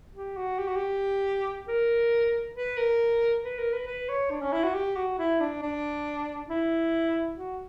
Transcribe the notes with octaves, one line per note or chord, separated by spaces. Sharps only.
G4
F#4
G4
F#4
G4
A#4
B4
A#4
B4
A#4
B4
B4
C#5
D4
C#4
E4
F#4
G4
F#4
E4
D4
D4
E4
F#4